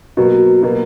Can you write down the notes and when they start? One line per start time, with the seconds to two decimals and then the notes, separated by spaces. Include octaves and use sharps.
0.17 B2 F#3 A#3
0.63 B2 F#3 A#3